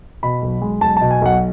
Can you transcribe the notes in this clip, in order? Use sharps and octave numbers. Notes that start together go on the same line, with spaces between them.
B2 B5
B1
G#3
B1 A5
B2 A5
G#5
B1 F#5